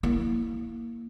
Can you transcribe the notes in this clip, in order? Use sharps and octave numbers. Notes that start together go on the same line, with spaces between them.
A#3 E4